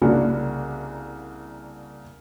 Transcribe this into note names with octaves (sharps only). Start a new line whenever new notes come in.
C2 C#3 A#3 D4 F#4